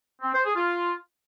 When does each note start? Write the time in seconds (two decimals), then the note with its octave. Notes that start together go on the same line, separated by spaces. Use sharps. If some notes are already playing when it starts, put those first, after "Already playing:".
0.22 C4
0.33 C5
0.44 G#4
0.55 F4